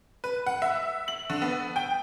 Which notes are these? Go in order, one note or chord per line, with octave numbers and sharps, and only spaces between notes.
B4
F#5
E5
F#7
D3
B3
G5